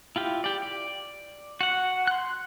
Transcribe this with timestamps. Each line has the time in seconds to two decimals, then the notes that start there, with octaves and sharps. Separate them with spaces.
0.16 E4 F4 G4
0.44 G4 D5
0.62 D5
1.61 F#4 F#5
2.07 C6 F#6